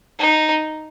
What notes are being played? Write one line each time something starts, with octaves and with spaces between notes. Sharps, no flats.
D#4